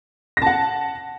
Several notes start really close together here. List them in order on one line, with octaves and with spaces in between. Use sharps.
A#6 A5 F#5